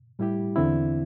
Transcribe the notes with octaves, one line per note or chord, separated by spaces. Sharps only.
A2 G3 E4 G4
E2 D3 C4 E4